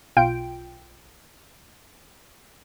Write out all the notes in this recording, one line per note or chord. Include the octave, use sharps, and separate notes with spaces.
B1 F4 G5 D7